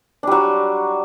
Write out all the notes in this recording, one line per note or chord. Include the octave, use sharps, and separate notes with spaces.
F#3 G3 D4